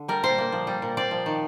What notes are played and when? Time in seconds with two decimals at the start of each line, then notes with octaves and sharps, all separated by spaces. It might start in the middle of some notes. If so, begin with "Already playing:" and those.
Already playing: D3
0.08 G3 A#4
0.23 A#2 C5
0.38 A#3
0.52 F3
0.67 G3
0.82 A#2
0.97 C4 D5
1.11 F3
1.26 D#3